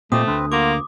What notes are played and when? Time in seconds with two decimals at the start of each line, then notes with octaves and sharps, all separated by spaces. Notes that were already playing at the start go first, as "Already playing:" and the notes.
0.12 A#2 A3 C4 G4 D#5 C6 D#6
0.27 D2 D3 C4 B4
0.52 A#3 F4 F#4 D6